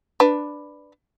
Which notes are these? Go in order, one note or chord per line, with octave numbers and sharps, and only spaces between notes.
D4 B4